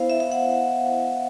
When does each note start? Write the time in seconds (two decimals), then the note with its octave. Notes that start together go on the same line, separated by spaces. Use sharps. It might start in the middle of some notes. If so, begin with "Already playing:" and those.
Already playing: B3 E4 C5 F5
0.10 E5
0.20 F5
0.32 F#5